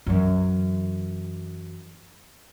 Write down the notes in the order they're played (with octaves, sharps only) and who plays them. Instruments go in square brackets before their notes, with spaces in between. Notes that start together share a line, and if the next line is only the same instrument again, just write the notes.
[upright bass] F#2 E3